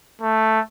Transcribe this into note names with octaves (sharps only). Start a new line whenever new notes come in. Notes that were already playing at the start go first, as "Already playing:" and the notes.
A3